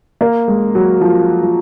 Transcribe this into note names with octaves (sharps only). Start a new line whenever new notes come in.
A#3
G#3
F#3
F3
F3